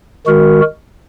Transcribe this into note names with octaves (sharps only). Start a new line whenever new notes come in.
D#3 G#3 F#4 A#4